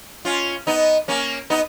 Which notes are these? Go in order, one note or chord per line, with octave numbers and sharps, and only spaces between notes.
C#4 F4
B3 D#4
A#3 C#4
B3 D#4